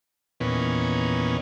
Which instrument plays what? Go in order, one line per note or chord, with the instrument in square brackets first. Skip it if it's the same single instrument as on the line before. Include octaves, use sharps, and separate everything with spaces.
[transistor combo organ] E2 A#2 D#3 B3 C#4